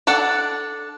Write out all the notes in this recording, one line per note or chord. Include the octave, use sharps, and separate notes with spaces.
D4 A4 F#5